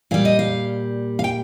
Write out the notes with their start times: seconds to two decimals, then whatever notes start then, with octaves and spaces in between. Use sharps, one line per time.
0.11 A#2 G3 F5
0.25 D#5
0.39 F5
1.19 F5
1.24 G5